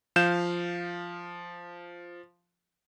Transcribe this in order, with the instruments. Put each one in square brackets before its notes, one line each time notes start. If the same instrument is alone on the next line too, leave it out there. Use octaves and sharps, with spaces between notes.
[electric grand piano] F3 F5 G6 E7